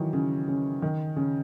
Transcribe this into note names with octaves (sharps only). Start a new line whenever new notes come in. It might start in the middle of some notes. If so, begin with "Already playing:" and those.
Already playing: D#3 E3 F#3
C#3
C#3
D#3
C#3